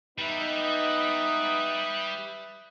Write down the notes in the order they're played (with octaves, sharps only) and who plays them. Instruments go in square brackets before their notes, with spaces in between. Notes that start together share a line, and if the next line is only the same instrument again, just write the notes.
[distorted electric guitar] G3 [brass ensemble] B3 D#4 [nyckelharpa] B4 E5
[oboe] D#6